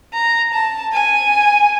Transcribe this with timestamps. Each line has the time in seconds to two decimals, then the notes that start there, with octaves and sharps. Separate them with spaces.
0.13 A#5
0.53 A5
0.93 G#5